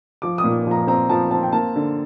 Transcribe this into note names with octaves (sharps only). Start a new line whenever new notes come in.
F3 D6
D#6
A#2
F3 A#5
C4 A#5
F3 A5
C4 A5
G5
A#3 A5
D3